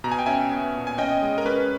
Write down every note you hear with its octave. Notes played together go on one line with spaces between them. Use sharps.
B2 A#5
G#5
G5
C#4 E5 G#5
B3
A#2
G#5
C#4 D#5 G5
G#3
A#4
C#4 B4